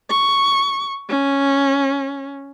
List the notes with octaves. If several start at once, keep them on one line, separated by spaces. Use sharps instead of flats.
C#6
C#4